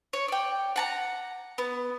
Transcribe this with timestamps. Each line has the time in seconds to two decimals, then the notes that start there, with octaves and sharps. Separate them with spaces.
0.13 C#5
0.28 D5 G5
0.76 F#5 A5 A#5
1.58 B3